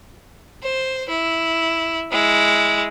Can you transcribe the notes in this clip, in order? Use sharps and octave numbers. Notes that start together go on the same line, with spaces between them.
C5
E4
G#3 E4